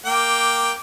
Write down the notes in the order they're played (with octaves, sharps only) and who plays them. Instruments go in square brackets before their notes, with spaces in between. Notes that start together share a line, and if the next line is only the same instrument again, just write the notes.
[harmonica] A#3 G5 [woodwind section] D6